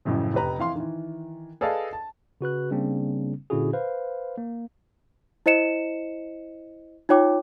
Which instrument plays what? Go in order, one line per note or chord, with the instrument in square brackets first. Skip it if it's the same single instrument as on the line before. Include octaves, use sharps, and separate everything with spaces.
[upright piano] A1 F#2 A2 C#3 F3
F1 G4 B4 A#5
F2 E3 F5 C6
D#3 E3
G#4 A4 B4 D5 D#5 F5
A5
[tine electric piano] C#3 F#4 B4 F#6
C#3 G3 A#3 C4 D4
A#2 D3 C#4 E4 F#4 G#4
B4 C5 F5
A#3
[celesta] E4 C5 D#5 C#7 E7
D#4 F4 C#5 G5 D6